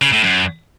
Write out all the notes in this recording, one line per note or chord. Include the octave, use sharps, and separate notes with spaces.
C#3
A2
F#2